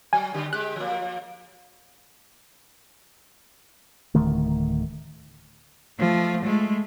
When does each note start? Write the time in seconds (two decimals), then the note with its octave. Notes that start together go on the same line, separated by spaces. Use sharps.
0.13 F#3 G#5
0.34 D3 G3 G4
0.53 G#3 G4 F#6
0.76 F3 A#3
4.15 D1 D3 D#3 A3
5.99 F3 A3
6.43 G#3 A3